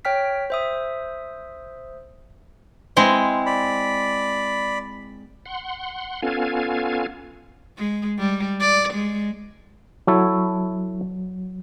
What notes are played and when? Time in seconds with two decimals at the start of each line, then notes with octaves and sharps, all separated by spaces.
0.05 C#5 G5 F6 B6
0.50 C5 E5 D#6
2.96 G#3 C4 E4
3.46 D5 B5
5.46 F#5 C6
6.22 B3 C#4 F4 A4 F5 G#5
7.78 G#3
8.19 G3
8.60 D5
8.94 G#3
10.07 F#3 E4 A4 C#5